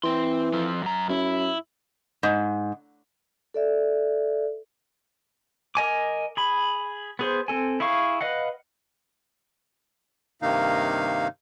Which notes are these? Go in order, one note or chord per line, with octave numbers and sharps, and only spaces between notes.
E3 C4 C6
F3 C4
F#2 A#5
F#2 E4
G#2
A4 D5 E5
A#4 D#5 G#5 D6
G#4 B5
B3 G#4 C5
C4 A4 G#5
E4 G#4 F5 C#6
B4 D#5 F5 F#5
G2 C3 D#3 A#3 D#4 F5